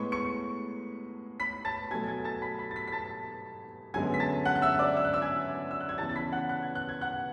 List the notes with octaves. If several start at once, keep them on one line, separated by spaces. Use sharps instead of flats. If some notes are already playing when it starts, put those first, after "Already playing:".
Already playing: A2 G#3 B3 C#6 C#7
C#6 C#7
B5 B6
A5 A6
B2 F#3 A3 G#5 G#6
G#5 G#6
A5 A6
B5 B6
B5 B6
A6
B5 B6
B6
A5 A6
F#2 D3 G#3 B3 G#5 G#6
B6
A5 A6
F#5 F#6
F#6
E5 E6
D5 D6
E6
F#6
E5 E6
G#5 G#6
E6
F#6
G#6
C#3 E3 B3 A5 A6
A6
B5 B6
F#5 F#6
F#6
G#6
F#6
G#6
F#5 F#6